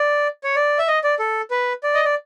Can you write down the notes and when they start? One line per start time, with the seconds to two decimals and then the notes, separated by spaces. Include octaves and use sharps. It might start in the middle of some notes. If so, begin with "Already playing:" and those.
Already playing: D5
0.44 C#5
0.56 D5
0.79 E5
0.88 D#5
1.04 D5
1.19 A4
1.51 B4
1.83 D5
1.94 D#5
2.05 D5